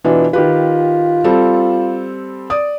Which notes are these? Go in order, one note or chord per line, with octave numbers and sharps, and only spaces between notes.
B2 E3 D4 F4
D#3 F4 G4 B4
G3 C4 A4
D5 D#6